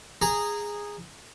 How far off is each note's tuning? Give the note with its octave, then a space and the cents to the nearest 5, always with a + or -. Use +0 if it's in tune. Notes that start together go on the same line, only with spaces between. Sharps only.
G#4 -10 A#5 -10